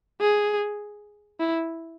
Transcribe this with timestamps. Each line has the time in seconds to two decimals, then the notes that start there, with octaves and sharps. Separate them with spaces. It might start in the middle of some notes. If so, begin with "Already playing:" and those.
0.21 G#4
1.39 E4